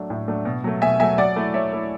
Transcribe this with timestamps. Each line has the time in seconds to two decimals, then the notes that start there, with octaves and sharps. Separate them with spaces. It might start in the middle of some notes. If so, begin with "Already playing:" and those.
Already playing: F#3 A3 D4
0.10 A2
0.28 F#3 A3 D4
0.45 B2
0.64 F#3 A3
0.82 B2 E5 G#5
1.00 F#3 A3 E5 G#5
1.18 F#3 D5 F#5
1.36 A3 E4
1.54 F#3 C#5 E5
1.73 A3 E4